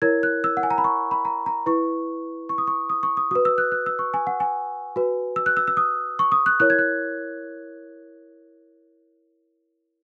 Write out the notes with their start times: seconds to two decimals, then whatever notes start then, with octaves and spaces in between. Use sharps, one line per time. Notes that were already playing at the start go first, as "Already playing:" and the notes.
0.02 E4 A#4 C#5 G#6
0.23 F#6
0.44 E6
0.57 F#5
0.63 G#5
0.71 A#5
0.78 B5
0.84 C#6
1.11 B5
1.25 A#5
1.46 A#5
1.66 E4 B4 C#6
2.49 C#6
2.58 D#6
2.67 C#6
2.90 D#6
3.03 C#6
3.17 D#6
3.31 F#4 B4 D#6
3.45 E6
3.58 F#6
3.72 F#6
3.86 E6
3.99 C#6
4.14 G#5
4.27 F#5
4.40 G#5
4.96 F#4 B4
5.36 E6
5.46 F#6
5.57 E6
5.68 E6
5.77 D#6
6.19 C#6
6.32 D#6
6.46 F#6
6.60 E4 A#4 C#5 F#6
6.70 G#6
6.79 F#6